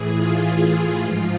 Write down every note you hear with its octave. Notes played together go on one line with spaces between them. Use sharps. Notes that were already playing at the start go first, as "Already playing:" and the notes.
Already playing: A2 E3 G#4
F4
G#2 F3